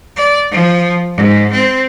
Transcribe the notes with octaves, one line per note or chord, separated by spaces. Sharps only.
D5
F3
G#2
C4